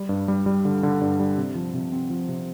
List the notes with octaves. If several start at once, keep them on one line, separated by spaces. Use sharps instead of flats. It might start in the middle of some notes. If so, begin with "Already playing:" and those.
Already playing: G3
G2
G3
G3
D3
D3
G2
G3
C3
F3
C3
C4
F3
C3